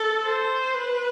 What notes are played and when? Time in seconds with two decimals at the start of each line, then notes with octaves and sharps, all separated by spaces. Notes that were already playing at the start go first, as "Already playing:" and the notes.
Already playing: A4
0.24 C5
0.75 B4